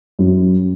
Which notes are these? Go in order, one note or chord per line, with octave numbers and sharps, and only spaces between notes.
F#2